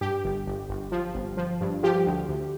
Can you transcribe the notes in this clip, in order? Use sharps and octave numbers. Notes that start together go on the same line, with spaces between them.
G2 G4
G1
G1
G1
F3
G1
F3
G2
F3 G4
D2
D2